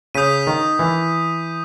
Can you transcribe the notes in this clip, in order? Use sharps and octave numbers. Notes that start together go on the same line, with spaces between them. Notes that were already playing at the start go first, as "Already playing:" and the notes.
C#3 D#6 G6 B6 D#7
D#3
E3